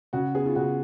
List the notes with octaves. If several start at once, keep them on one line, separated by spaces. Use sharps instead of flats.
C#3 F#4
B3 G#4
F4
C#3 F#4